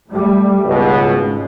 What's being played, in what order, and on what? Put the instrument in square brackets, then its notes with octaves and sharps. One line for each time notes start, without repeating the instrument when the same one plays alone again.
[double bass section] G3 A3
[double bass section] G#1 G#3 [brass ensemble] C#2 B2